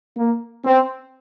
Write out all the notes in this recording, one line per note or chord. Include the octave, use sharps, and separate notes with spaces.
A#3
C4